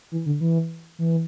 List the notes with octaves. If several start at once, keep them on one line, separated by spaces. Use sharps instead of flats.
E3
D3
E3
E3